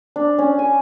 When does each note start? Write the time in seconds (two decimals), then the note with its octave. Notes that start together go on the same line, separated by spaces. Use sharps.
0.16 D4
0.38 C#4
0.59 G#5